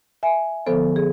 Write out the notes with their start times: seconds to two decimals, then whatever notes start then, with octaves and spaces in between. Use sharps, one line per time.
0.23 E5 G#5
0.66 D3 F3 B3 A4 C5
0.96 G#4